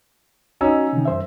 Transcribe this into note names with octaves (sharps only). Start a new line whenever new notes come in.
C#4 D#4 F#4 A#5 E6
C3 D#3
F#2 C5 E5